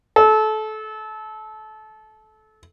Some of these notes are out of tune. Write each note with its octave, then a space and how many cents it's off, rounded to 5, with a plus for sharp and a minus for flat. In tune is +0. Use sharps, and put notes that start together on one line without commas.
A4 -25